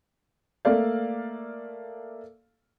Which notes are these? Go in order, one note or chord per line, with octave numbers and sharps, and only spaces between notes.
A3 A#3 A4 D5 F5